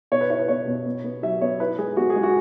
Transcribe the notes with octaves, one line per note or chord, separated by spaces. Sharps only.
B2 C#5
B4
E4 C#5
B4
B2 C#5
B2
B3
B3
F#3 E5
B3 C#5
E4 B4
G#3 G#4
B3 F#4
G#4
G#3
F#4